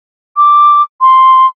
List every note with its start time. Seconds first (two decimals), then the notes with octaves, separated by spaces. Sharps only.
0.37 D6
1.01 C6